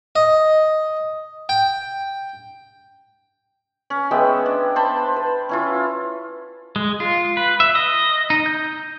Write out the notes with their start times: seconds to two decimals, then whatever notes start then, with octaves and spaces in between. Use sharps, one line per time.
0.16 D#5
1.49 G5
3.90 C#4
4.11 G#3 B3 E5 G5
4.46 D4
4.76 C5 A5 B5
5.16 B4
5.49 C#4 E4 F4
6.76 G#3
7.00 F4
7.37 B4
7.60 E5
7.75 D#5
8.30 D#4
8.46 G6